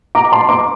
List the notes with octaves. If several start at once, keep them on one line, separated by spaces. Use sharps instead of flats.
A#5 D6
A5 C6
A#5 D6